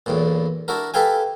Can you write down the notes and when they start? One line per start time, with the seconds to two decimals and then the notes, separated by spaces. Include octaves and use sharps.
0.06 B1 E2 A#2
0.68 D4 E4 F#4 A#4
0.94 G4 A4 B4 F5 G5 G#5